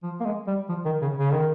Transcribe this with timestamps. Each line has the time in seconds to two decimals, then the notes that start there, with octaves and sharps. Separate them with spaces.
0.03 F3
0.21 A#3
0.25 G#3
0.47 G3
0.69 F3
0.86 D#3
1.02 C#3
1.18 C#3
1.32 D#3